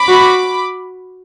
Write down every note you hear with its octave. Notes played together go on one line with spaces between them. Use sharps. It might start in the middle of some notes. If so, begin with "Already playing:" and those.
Already playing: B5 D6
F#4